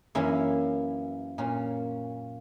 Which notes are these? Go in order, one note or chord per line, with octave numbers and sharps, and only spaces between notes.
F#2 E3 A#3 C#4 E4
A#2 A#3 C#4